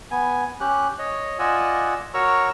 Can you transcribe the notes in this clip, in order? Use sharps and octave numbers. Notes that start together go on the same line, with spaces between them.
B3 G#5
C#4 G4 F#6
C#5 D#5
F4 D5 D#5 F#5 G#5 E6
F#4 A#4 C#5 A#5 C#6 E6